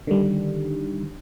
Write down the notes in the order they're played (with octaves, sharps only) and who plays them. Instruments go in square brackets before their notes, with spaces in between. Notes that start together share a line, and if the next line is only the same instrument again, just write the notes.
[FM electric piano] D3 D#3 G3